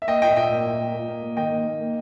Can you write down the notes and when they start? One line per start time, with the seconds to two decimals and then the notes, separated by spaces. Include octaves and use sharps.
0.02 E5
0.07 A#3 D#5 G5
0.22 A#2 D#5 G5
0.31 E5
0.36 A#2 D#5 G5
0.51 A#3
0.66 A#2
0.80 A#3
0.94 A#3
1.08 A#3
1.23 A#3
1.37 D#3 D#5 G5
1.51 A#3
1.66 A#3
1.81 A#3